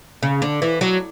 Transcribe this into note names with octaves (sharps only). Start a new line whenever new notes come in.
C#3
D3
E3
F#3